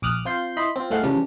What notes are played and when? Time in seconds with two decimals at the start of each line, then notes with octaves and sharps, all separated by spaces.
0.02 A#1 D6 D#6 F6 F#6
0.25 C4 F4 G6 C7
0.57 E4 D#5 B5 C6
0.76 C4 F4
0.90 A2 G#3 A3 F5 F#5 C7
1.03 C#3 E3 F3 G3 C#4 D4